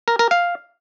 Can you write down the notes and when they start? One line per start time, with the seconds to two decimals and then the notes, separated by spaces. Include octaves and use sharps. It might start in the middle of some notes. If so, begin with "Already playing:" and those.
0.08 A#4
0.19 A#4
0.31 F5